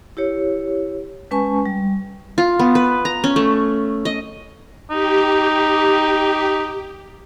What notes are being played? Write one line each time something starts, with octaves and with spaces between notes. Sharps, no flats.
E4 G4 C#5
G#3 C#4 B4 G#5 A5 C#6
G3
F4
B3
B4
A#5
C#4
A3
D#5
D#4 G4